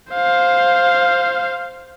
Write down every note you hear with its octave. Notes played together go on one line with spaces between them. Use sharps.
C5 F5